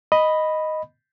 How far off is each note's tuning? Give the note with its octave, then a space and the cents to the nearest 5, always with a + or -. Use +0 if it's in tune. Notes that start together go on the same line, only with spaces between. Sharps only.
D#5 +0 B5 +0